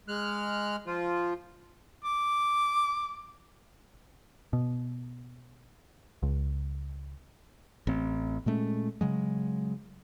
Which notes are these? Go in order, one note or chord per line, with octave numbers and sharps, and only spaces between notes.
G#3 F6 F#6
F3 F4
D6
B2
C#2
A1 C4
A#2 G#3 A3 C#4
C#3 F#3 G#3